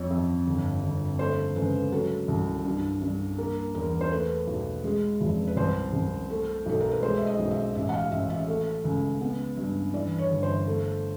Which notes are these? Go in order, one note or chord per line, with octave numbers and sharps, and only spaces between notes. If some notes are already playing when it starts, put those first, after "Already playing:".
Already playing: F2 C#5
F2
G1
G1
A3 C5
C#2 B4
F#3 A4
C2
G2
G2
A#3 A#4
E2 A#4
C5
A3 B4
B1
G#3
F1
B4
C2 C5
C2
A3
B1 A4
A#4
B4
G#3 C5
E5
D#5
B1
E5
A1 E5
F#5
F5
A1 E5
E5
A3
C#2
B3
G2
E3 D5
C#5
G1
C5
A3